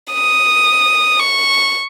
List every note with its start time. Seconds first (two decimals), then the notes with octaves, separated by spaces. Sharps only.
0.13 D#6
1.20 C#6